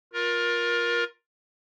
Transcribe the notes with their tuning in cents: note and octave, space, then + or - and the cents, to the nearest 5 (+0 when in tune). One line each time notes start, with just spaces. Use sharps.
F4 +20 A#4 +20